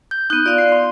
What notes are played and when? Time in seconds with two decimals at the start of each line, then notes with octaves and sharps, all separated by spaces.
0.11 G6
0.30 B3 D#4 F#6
0.46 F4 D5 F5
0.58 C7
0.72 C6